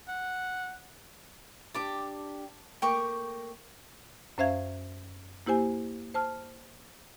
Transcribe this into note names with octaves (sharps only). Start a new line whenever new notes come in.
F#5
D4 G4 G5 A5 D6
A3 A#3 A#4 G5 C#6 D6
F#2 C#4 C5 E5 F5 G#6
A#3 E4 G4 C5 G#5
C5 A5 F6